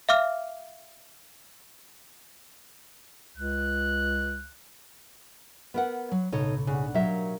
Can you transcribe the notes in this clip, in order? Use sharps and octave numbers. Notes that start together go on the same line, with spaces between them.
E5 F5 D6 F6
C#2 F#6
B3 A#4 B4 F#5
F#3
B1 A2 C#3 D#4 A4 C#5
C#3 D4 D#4 F#5
F#3 G4 A#4 E5 F5